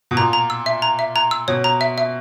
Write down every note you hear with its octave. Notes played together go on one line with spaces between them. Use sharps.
B2
A#2 A#5
A#5
E6
E5
A#5
E5
A#5
E6
B2 C#5
A#5
E5
E5